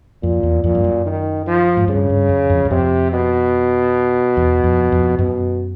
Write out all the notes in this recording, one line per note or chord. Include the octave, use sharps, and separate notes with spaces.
F2 A#2
E2
F2 A#2
G2
F#2
D#3
F3
G#2
G2 C#3
G2
F#2
F2
F#2
F2 C3
B2
E2
F2
F2
F#2 B2